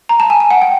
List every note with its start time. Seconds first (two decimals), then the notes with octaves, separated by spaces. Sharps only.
0.09 A#5
0.20 A5
0.30 G#5
0.40 G#5
0.51 F#5
0.62 G5